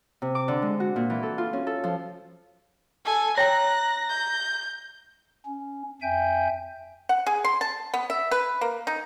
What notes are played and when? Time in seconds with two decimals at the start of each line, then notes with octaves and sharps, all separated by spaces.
0.22 C3
0.35 D6
0.48 D3
0.62 G#3
0.80 F#4
0.96 A#2
1.10 E3
1.23 A4
1.38 F4
1.53 C#4
1.67 A4
1.84 F3
3.06 A4 G#5
3.38 C#5 G5 A#5 F#6 A#6
4.10 G6
5.46 C#4
6.02 F2 E5 G5 G#5 G6
7.09 F#5
7.27 G#4
7.45 C6
7.61 A5
7.94 B3
8.10 E5
8.31 B4
8.61 A#3
8.87 D#4